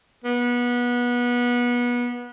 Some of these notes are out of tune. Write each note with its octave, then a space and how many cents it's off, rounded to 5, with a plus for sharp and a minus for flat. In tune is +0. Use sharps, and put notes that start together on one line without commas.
B3 -25